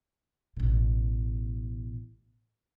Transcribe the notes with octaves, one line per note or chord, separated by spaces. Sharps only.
A1 B2